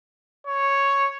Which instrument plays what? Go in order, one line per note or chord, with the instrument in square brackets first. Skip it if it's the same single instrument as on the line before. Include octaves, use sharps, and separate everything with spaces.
[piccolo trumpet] C#5